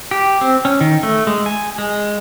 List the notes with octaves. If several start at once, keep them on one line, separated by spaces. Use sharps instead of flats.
G4
C4
C#4
D#3
A3
G#3
G#5
G#3